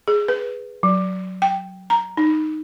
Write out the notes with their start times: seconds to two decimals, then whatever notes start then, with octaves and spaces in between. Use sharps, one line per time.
0.08 G#4
0.28 B4
0.83 F#3
1.42 G5
1.90 A#5
2.17 D#4